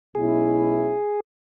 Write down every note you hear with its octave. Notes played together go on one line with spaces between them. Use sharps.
B1 B2 G#3 C#4 E4 G#4